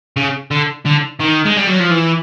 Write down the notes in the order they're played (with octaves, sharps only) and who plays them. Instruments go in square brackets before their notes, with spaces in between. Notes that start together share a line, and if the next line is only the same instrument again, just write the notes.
[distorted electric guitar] C#3
D3
D3
D#3
G#3
G3
F#3
F3
E3